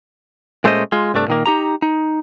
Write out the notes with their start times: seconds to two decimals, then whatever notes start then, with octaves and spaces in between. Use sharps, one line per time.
0.64 A#2 G#3 A3 C#4 C5 D#5
0.92 G#3 F4
1.14 C2 G2 A3 D4
1.28 A#2 D#3 A#3
1.46 D#4 G4 A#5
1.82 D#4